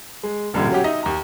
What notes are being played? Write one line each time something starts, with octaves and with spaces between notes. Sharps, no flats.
G#3
E1 A1 G2 A#2 D3
F#3 C#4 F#4 G4
D#4 D#5 E5
D#2 A#5